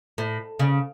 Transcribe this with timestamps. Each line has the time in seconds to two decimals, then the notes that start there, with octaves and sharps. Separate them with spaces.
0.18 A2
0.59 C#3